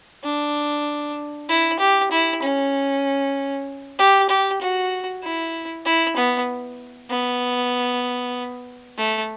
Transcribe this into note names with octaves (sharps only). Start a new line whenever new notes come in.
D4
E4
G4
E4
C#4
G4
G4
F#4
E4
E4
B3
B3
A3